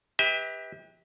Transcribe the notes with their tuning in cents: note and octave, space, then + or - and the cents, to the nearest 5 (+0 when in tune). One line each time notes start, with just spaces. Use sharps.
G4 +25 B4 +0 E5 -40